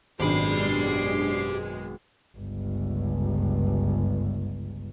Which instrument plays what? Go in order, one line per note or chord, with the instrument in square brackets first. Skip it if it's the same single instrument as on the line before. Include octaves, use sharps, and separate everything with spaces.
[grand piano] G#1 [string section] F#2 B2 G#3 [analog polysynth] D4 C7 [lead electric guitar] G4 B5
[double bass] G1 C#2